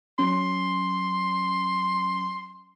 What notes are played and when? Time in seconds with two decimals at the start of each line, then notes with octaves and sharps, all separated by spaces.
0.19 F#3 C#4 C6